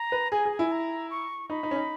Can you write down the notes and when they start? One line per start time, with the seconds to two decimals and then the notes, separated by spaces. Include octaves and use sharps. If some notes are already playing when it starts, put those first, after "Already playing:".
Already playing: A#5
0.12 B4
0.32 G#4 G#5
0.45 G#4
0.52 G#5
0.59 E4
0.72 A#5
1.11 C#6
1.50 D#4 B5
1.63 D#4
1.71 C#4
1.76 D#4